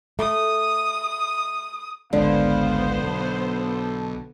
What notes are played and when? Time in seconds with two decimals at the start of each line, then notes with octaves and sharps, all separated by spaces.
0.19 A3 D#6
2.13 G#1 C#2 D3 G#3 B3 C5 F5
3.03 B1 A4